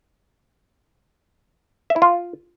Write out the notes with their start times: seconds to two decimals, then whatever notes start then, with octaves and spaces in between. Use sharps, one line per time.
1.90 E5
1.96 E4
2.02 F4